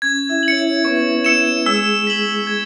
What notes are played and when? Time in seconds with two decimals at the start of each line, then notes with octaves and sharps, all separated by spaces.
0.02 C#4 G#6
0.29 E4 E5
0.43 F#7
0.48 C#5 C#7
0.57 E4 E5
0.84 B3 B4 C#6
1.24 E6 C#7 E7
1.66 G#3 G#4 E6
2.07 B6 F#7
2.47 G#6